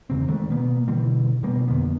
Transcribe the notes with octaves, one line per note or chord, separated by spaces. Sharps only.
E2 C#3 C4
D#3 G#3 A3
B2 A#3 B3
B2 D3 E3 G3
B2 G3 A#3 B3
F2 D3 A#3 B3